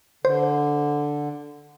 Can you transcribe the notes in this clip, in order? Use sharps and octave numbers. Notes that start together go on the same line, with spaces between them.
D3 C5